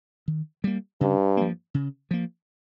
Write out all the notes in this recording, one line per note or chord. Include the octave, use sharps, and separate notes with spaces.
D#3
G3 A#3
G2 C#3
F3 A#3
C#3
F3 A#3